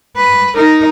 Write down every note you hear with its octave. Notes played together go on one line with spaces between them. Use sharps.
B4
D#4 A#4